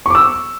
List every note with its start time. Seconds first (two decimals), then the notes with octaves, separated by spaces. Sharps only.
0.06 C#6
0.10 D6
0.15 E6